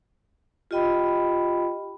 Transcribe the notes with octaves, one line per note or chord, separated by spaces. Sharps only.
F4 G4 D#5 G5 B5